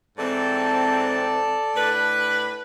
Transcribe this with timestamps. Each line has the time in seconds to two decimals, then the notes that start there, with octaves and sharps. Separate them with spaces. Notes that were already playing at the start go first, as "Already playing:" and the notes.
0.18 G#2 E3 C4 A4 D5 A5
1.75 A2 D4 B4